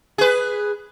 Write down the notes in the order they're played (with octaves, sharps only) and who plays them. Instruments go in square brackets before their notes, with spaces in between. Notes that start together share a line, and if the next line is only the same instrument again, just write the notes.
[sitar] G#4 B4